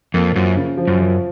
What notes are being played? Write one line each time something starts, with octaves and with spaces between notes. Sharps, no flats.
F2 A#3
F#2 F3
C#3
F3
F#2
F3